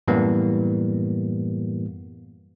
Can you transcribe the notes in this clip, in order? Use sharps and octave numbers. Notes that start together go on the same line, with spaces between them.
F#2 A2 E3 G3 A#3 B3